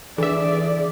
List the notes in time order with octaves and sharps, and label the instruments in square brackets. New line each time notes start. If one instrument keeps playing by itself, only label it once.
[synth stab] D3 E5 [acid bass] E3 [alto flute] G#4 [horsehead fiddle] D5